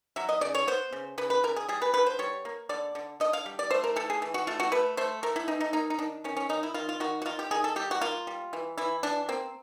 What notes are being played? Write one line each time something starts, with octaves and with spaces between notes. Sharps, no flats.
F#3 E5
D#5
C#3 D5
C#5
B3 C5
C#3
C#3 B4
B4
C#3 A#4
G#4
G3 G#4
B4
D3 B4
C5
G3 C#5
A#3
D3 D5
D3
D3 D#5
F5
G3
D5
A3 C5
A#4
E3 A4
G#4
E3
F#4
A3 F4
F#4
A3 B4
A3 C5
A3 A#4
E4
E3 D#4
D#4
A#3 D#4
D#4
D#3 D4
D#3 C#4
C#4
D#3 D#4
E4
D#3 F4
F4
D#3 F#4
F#4
D#3 F4
G4
D#3 G#4
A4
G3 G4
F#4
A#3 F4
G3
E3
E3 E4
E3 D4
A#3 C4